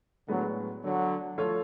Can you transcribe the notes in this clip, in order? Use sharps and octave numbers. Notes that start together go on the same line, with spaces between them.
A2 D3 F#3 G#3 B3
D3 F#3
F3 A3 F4 A4 C#5